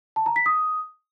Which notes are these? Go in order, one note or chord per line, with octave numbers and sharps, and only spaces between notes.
A5
A#5
B6
D#6